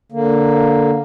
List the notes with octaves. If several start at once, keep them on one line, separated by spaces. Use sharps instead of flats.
D3 A#3